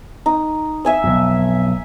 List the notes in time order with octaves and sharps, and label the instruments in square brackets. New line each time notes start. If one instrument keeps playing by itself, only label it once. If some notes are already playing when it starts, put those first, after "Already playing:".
[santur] D#4
E5 G#5 E6
[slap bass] B1 F2